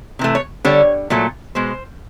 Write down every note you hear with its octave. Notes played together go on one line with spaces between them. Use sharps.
C3 E3 A3
C#5
D3 G3 C#5
A#2 F#3 A3
B2 G#3 C5